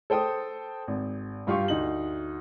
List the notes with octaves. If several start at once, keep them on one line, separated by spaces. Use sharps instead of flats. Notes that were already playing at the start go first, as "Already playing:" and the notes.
A4 C5 G5 D#6
G#1
G2 F4 G4 F5 C6 C#6
D2 D#4 F#7